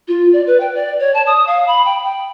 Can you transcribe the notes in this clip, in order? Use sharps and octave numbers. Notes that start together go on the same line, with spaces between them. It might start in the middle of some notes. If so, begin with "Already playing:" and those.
F4
D5
B4
G5
D5
C#5
A5
D#6
F5
B5
G5
G5